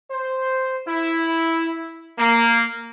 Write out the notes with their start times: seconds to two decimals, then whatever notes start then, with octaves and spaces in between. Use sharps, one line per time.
0.10 C5
0.87 E4
2.18 A#3